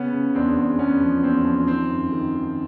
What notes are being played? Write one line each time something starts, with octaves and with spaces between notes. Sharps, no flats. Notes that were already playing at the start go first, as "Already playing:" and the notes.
Already playing: C#3 B3 C#4
C#3
E2 C4 D4
E2
E2 B3 C#4
F3
E2 C4
F3
D#3 C4
F#2
D#3
D#3